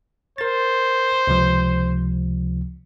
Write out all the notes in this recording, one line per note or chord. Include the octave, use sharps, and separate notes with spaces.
A#4 C5 A6
C#2 C3 F3